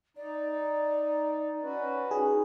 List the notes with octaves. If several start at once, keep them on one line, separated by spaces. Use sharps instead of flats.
D#4 D5
C#4 F#4 B4
D#4 G#4